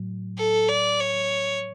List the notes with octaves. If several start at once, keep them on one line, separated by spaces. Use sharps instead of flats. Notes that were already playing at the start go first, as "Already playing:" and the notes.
Already playing: A2 F#3
A4
D5
C#5